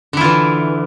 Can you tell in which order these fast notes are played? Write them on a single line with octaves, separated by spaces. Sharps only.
D3 E4 F4 E3